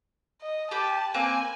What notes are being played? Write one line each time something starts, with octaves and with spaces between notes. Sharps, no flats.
D#5
G4 B4 A5
A#3 C4 B4 G#5